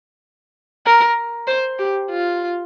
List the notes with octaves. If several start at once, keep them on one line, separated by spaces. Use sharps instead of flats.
A#4
C5
G4
F4